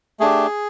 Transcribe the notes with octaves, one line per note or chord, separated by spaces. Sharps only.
A3 D4 G4 G#4